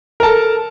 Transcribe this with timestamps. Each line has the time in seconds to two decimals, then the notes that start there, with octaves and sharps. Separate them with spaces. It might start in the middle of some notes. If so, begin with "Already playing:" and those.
0.20 A#4
0.23 A5
0.26 A4